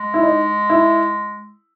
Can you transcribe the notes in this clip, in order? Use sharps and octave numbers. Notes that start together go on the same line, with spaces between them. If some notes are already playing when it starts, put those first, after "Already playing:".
Already playing: G#3
E4
D#4
E4